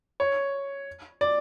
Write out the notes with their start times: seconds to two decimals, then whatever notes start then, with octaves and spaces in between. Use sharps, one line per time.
0.20 C#5
1.21 D5